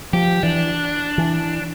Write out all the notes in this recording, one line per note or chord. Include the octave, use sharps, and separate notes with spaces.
F3 G4
E3 D4
E3